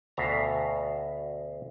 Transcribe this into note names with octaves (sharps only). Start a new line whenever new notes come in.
D2 B2 E5 F5 A5 A#5